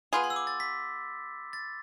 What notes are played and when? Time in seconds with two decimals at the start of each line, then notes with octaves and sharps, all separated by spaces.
0.13 B3 F4 G#4 B5
0.24 C6
0.30 E6
0.36 D6
0.47 A6
0.60 B6
1.53 A6